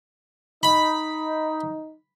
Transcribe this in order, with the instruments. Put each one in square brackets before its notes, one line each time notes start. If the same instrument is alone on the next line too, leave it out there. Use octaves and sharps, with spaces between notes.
[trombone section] D#4 [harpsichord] B5